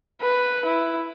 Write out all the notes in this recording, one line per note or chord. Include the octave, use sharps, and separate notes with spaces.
B4
E4